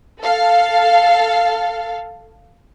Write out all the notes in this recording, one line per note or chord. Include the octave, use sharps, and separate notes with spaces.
A4 F5